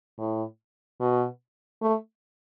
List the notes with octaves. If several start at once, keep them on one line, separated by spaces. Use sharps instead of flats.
A2
B2
A3